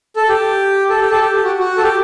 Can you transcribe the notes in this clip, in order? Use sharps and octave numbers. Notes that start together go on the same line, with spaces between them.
A4
G4
A4
G4
A4
G4
G4
F#4
F#4
A4
G4